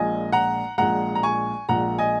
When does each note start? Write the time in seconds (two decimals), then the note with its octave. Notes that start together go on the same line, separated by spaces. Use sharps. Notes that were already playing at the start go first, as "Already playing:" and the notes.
Already playing: A#1 A#2 G#3 D#5 G#5
0.32 F#5 A#5
0.78 A#1 A#2 G#3 F#5 A#5
1.15 A#5
1.23 G#5 C#6
1.69 A#1 A#2 G#3 F#5 A#5
1.98 D#5 G#5